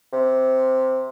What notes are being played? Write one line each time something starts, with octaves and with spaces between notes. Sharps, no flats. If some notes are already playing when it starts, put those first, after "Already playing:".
C3